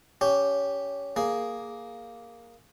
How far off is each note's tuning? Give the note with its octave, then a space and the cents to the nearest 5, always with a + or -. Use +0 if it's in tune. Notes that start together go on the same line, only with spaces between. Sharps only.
C#4 +20 G4 +0
A#3 +0 G#4 +0